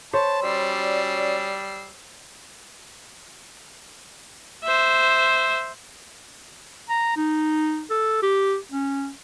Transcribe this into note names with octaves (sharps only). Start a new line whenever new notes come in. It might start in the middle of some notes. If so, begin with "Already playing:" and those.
C5 C#5 A5 B5
G3 C#4 F#4 D5 E6 C7
C5 E5
A#5
D#4
A4
G4
C#4